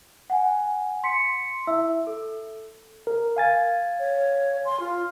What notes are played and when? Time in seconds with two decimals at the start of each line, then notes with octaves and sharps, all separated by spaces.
0.30 F#5 G#5
1.03 C6 B6 C#7
1.67 E4 E5 E6
2.07 A4
3.07 A#4
3.37 F5 G#5 A6
3.99 C#5
4.65 C6
4.80 F4